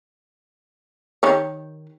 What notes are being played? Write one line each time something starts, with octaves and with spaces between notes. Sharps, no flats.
D#3 G4 C#5